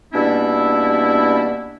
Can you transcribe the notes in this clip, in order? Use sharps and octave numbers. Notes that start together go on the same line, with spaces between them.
B2 G3 A#3 C#4 D4 E4